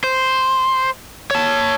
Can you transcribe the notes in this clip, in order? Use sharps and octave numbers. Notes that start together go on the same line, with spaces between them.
C5
C#5 A5